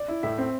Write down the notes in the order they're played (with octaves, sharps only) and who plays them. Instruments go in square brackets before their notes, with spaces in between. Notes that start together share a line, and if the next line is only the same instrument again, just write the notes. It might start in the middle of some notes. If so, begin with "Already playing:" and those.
Already playing: [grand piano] D5
[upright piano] E4
[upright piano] A2 [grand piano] E5
[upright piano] C4